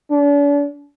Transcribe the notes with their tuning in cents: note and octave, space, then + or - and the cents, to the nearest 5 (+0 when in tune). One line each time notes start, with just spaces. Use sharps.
D4 -40